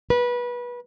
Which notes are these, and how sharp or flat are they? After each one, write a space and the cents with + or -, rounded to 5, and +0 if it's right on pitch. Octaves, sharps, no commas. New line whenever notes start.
B4 -25